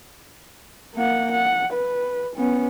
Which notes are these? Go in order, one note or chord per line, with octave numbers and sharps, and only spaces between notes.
A#3 F#5
F#5
B4
B3 C#4